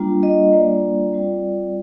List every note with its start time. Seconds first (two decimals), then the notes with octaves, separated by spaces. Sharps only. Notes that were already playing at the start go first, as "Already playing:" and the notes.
Already playing: G3 A#3 D4 F4
0.23 D#5
0.53 G3 A#3 D4 F4 D5
1.13 G3 C4 F4